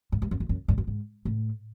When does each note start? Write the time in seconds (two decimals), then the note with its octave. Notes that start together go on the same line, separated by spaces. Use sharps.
0.12 G#2
0.22 G2
0.31 F#2
0.40 F2
0.49 F#2
0.68 G2
0.78 F#2
0.87 G#2
1.25 A2